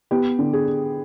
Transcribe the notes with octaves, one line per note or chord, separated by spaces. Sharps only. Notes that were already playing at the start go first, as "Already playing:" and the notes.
B3 G4
D3
G#4